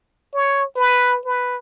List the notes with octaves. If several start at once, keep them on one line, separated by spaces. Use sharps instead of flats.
C#5
B4
B4